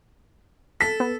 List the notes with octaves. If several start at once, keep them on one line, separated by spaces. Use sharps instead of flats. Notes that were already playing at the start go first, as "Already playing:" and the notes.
A4 B6
B3